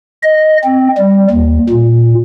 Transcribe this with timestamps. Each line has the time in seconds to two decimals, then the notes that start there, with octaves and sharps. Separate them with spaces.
0.23 D#5
0.64 C4
0.98 G3
1.30 D#2
1.69 A#2